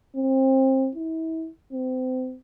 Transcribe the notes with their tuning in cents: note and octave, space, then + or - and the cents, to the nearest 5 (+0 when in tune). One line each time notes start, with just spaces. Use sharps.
C4 +25
E4 -35
C4 -30